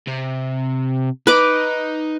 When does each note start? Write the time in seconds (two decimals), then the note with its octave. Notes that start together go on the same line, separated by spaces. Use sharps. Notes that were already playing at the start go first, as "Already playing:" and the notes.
0.08 C3
1.27 D#4 B4 D6